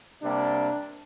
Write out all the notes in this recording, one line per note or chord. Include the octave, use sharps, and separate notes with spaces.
C3 G3 A#3 D4